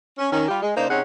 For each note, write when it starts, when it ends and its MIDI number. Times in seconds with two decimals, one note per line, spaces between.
0.19 0.30 61
0.32 0.48 51
0.32 0.48 61
0.48 0.60 55
0.48 0.60 65
0.48 0.60 67
0.62 0.75 56
0.76 0.88 49
0.76 0.88 58
0.76 0.88 62
0.76 0.88 63
0.76 0.88 72
0.90 1.01 48
0.90 1.01 60
0.90 1.01 61
0.90 1.01 63
0.90 1.01 68
0.90 1.01 78